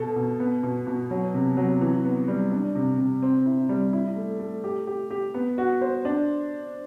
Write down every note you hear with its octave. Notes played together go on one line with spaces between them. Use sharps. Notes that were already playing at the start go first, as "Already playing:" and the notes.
Already playing: B2 A4
B2
B3
B2
B2
F#3
C3
F#3
E3
B3
G3
D4
C3
C3
C4
E4
G3
E4
A3
A3
G4
G4
G4
B3
F#4
C5
D4